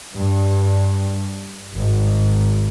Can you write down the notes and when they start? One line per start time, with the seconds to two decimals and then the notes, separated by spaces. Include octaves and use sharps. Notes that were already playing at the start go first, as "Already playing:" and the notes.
0.14 G2
1.76 G#1